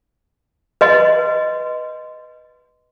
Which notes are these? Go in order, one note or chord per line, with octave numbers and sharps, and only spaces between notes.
B4 D#5 C6